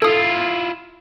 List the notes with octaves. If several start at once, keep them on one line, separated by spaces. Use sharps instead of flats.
E4 F4 A4 D#6